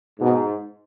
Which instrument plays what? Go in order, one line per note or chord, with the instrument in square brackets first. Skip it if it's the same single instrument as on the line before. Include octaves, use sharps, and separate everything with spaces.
[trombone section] G#2 [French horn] B2